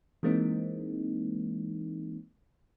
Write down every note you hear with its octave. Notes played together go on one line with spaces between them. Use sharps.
E3 G#3 A#3 C4 D#4